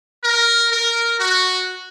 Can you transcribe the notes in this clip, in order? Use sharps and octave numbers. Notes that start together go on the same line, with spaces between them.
A#4
A#4
F#4